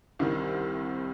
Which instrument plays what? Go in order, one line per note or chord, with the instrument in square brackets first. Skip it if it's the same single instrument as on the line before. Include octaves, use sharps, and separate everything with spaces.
[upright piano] C2 C3 D#3 G3